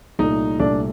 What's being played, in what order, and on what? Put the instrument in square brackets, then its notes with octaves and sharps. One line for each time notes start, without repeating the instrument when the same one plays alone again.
[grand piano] C2 A#2 A3 [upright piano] D#4
[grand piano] C2 A#2 A3 [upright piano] D4